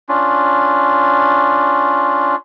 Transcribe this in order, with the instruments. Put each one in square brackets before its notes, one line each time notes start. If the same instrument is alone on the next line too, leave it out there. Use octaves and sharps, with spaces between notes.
[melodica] C#4 D4 F4